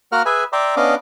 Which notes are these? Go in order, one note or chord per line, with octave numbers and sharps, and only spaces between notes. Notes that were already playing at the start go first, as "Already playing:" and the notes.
A#3 F#4 A#4 F#5 A#5 F6
G#4 B4 E5 G#5
D5 E5 G5 A#5 C6 D6
B3 C#4 D4 D#5 F5 D6